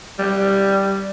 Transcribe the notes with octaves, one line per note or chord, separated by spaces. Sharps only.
G3